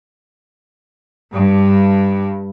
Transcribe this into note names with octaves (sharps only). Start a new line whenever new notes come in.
G2